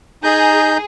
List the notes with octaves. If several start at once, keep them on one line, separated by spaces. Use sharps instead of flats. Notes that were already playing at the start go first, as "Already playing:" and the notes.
D#4 G#4 A#5 G6